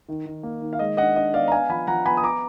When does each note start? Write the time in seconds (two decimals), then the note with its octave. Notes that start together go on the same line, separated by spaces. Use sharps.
0.09 D#3
0.26 D#3
0.43 A#3
0.61 D#3
0.73 F5
0.79 G#3 D#5
0.97 D4 D#5 F#5
1.16 D4 D#5
1.34 B3 D5 F5
1.48 A#5
1.52 B3 F5 G#5
1.70 F3 G#5 B5
1.87 F3 F#5 A#5
2.06 B3 G#5 B5
2.17 D#6
2.23 A#5 D6